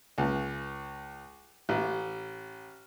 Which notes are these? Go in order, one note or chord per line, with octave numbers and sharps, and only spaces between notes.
C#2
A1